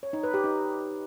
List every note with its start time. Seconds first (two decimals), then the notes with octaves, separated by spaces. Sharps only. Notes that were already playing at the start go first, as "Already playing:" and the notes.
0.03 C#5
0.13 D#4
0.23 B4
0.34 G4
0.44 D#4